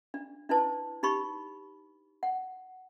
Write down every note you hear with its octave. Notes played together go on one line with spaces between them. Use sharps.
D4
D4 E4 B4 A5
D#4 G4 B5 C#6
F#5